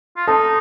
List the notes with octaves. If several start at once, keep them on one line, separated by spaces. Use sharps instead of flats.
F4
D#4 A4 A5